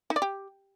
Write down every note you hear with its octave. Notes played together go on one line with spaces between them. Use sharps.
D#4
D5
G4